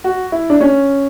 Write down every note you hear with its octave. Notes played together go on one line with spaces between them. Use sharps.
F#4
E4
D4
C#4